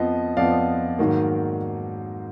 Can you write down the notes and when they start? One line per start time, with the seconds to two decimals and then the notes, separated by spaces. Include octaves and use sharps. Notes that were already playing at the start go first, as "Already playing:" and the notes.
Already playing: F2 F3 B3 D#5
0.37 F2 F3 B3 D5 F5
0.99 G#2 D#3 F#3 A#3